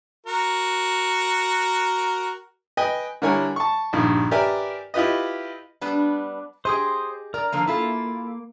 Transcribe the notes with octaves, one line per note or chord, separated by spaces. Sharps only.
F#4 A#4
B4 D#5 G5 G#5
D3 G3 E4 A#4 C#5 G#5
A5 C#6
A#1 G2 D#3
G4 A#4 B4 D5 E5 G#5
E4 F4 G4 B4 D#5
G3 B3 D4
G4 G#4 C5 D#5 C6 D#6
A#4 D5 A#5
D3 F3 A#3
A#3 E4 F4 A4